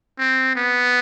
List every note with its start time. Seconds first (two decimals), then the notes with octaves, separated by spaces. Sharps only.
0.19 C4
0.55 B3